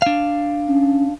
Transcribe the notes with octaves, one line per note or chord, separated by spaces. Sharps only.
D4 F5
C#4